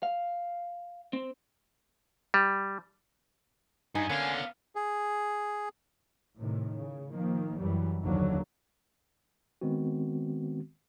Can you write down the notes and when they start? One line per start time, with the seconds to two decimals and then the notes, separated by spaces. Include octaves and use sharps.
0.03 F5
1.13 C4
2.34 G3
3.95 G2 D#4 G#5
4.10 D3 A#3 B3 C#4 F5
4.76 G#4
6.37 A2 C3 D#3
6.75 C#3
7.11 D#3 F3 A#3
7.58 F#2 E3 F#3 G3
8.02 F#1 D#2 D3 F3 F#3
9.61 D#3 G#3 B3 C4 F#4